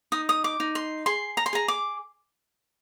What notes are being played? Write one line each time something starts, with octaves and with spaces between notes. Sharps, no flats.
D#4 D#6
D#6
D6
D#4
C6
G#4 C6
A#5
C6
G#4 A#5
D6